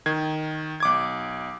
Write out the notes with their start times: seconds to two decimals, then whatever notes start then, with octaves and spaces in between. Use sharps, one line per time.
0.06 D#3 G#6
0.80 B1 D6 G#6